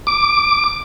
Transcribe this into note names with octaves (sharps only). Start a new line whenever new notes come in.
D6